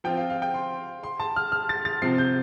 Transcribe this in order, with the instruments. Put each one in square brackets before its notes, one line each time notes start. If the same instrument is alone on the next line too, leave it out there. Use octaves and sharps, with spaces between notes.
[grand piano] F3 C4 F4 [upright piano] G5
[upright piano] F5
F5
G5
C6
C6
A5
F6
F6
A6
A6
[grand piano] C3 F3 C4 [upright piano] C7
[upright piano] G6